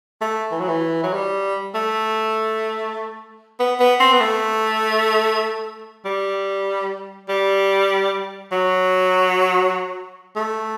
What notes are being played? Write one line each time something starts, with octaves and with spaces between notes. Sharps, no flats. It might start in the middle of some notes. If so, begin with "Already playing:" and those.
A3
E3
F#3
E3
F#3
G3
A3
B3
B3
C4
B3
A3
G3
G3
F#3
A3